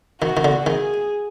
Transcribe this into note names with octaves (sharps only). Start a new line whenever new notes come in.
D#3 F#4
D#3
D3
D#3 G#4